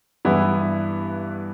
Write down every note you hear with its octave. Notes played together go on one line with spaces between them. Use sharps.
G2 E3 B3 E4